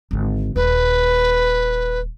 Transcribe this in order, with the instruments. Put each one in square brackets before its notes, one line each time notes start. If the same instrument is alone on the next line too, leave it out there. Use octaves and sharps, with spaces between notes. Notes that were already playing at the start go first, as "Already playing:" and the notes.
[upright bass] G#1 D3
[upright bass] D#1 [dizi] B4